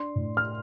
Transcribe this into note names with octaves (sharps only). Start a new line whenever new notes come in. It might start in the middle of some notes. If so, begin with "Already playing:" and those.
Already playing: D4 C6
A2
F6